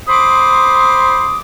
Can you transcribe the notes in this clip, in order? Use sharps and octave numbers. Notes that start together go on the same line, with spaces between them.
C5 B5 C6 D6 D#6